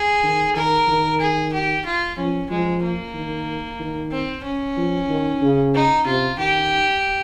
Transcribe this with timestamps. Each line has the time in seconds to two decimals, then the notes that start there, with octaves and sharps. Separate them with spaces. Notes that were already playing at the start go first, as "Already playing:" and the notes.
Already playing: G#4
0.23 D#3
0.56 D#3 A#4
0.88 D#3
1.21 G#4
1.53 G4
1.86 F4
2.17 F3 C#4
2.50 F3 G#3
2.83 A#3
3.15 D#3
3.80 D#3
4.12 C4
4.45 C#4
4.77 F3
5.09 D#3
5.42 C#3
5.74 D#4
6.06 C3 F4
6.38 D#3 G4